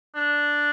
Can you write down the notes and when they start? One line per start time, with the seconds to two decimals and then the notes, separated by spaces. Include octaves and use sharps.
0.15 D4